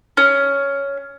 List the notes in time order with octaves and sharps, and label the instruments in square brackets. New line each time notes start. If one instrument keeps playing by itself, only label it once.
[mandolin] C#4